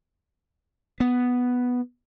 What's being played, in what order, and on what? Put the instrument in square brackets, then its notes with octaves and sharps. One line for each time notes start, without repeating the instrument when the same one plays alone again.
[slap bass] B3